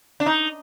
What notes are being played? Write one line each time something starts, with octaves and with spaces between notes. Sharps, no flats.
D4
D#4